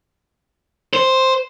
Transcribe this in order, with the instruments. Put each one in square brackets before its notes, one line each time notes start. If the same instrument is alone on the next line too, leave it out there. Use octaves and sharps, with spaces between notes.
[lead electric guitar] C5